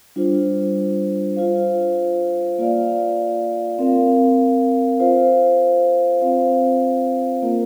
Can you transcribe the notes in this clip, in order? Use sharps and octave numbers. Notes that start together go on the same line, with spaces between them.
G3 D4 F4 C5
F4 C5 F5
A#3 F4 D5 F5
C4 A#4 F5
F4 C5 F5
C4 F4 C5 F5
A#3 F4 A#4